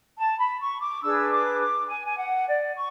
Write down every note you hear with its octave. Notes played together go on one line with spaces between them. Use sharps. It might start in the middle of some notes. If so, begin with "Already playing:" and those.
A5
B5
C#6
D6
D4 G#4 B4 E6
D6
D6
G#5
G#5
F#5
D5
C#6